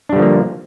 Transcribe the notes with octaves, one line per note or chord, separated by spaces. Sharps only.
D3 F3 G3 A#3 D4